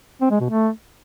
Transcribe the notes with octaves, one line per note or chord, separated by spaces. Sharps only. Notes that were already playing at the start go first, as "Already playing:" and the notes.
C4
G#3
B2
A3